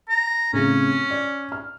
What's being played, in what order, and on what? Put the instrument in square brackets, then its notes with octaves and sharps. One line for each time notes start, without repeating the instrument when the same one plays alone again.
[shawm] A#5
[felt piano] A2 C#3 C4 [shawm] C#4
[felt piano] D5
F6